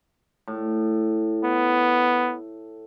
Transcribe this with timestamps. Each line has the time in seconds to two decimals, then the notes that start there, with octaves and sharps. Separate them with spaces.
0.48 A2
1.44 B3